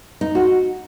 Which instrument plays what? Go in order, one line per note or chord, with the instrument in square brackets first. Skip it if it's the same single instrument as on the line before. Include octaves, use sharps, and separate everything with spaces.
[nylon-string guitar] D#4
F#4